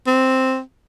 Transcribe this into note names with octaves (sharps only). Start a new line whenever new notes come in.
C4